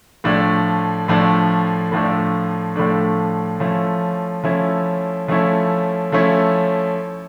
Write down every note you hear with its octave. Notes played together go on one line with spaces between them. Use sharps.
A2 F3 A3 D4
A2 F3 A3 D4
A2 F3 A3 D4
A2 F3 A3 D4
F3 A3 C#4 E4
F3 A3 C#4 E4
F3 A3 C#4 E4
F3 A3 C#4 E4